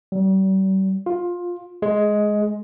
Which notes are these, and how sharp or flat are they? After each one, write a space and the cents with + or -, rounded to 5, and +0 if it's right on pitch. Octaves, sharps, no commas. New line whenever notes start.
G3 -40
F4 +15
G#3 +10